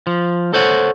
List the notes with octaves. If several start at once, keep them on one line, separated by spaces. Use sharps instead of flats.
F3
A4 C5 C#5 F#5